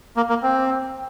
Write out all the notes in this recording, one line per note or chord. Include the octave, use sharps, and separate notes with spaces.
A#3
A#3
C4